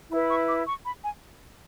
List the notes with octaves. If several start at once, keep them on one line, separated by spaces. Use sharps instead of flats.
E4 B4 B5
C#6
D6
C#6
B5
G#5